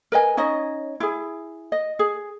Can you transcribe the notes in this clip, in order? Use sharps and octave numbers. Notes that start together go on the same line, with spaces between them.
A#4 B4 D#5 G#5
C#4 D#4 C#5 D#5
E4 G#4
D#5
G#4